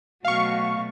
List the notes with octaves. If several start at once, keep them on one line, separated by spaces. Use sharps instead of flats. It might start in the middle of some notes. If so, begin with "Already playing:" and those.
B2 F#3 A3 F5 C#6